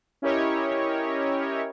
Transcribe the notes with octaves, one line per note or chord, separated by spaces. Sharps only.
C#4 E4 G4 A#4 C#5 D#5